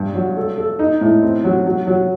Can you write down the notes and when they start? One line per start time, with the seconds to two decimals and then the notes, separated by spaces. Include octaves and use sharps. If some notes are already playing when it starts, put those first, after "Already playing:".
Already playing: G2
0.15 F#3
0.37 A4
0.58 A4
0.79 D#4
1.01 A2
1.22 C4
1.44 F#3
1.66 F#3
1.87 F#3